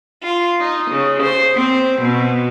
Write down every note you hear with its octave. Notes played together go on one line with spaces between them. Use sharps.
F4
D#4
C#3
C5
C4
B2